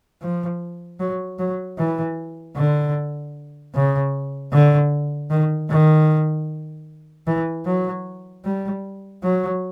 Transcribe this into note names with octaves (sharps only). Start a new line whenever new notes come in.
F3
F#3
F#3
E3
D3
C#3
D3
D#3
D#3
E3
F#3
G3
F#3